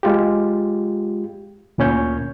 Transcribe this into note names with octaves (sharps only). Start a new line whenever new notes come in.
G#3 F4 G4
D2 A#2 C#4 C#5 G6